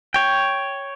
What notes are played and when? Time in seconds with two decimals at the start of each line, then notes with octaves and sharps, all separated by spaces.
0.14 C#5 G5